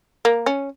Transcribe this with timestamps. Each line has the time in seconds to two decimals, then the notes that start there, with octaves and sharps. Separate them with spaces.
0.25 A#3
0.46 C#4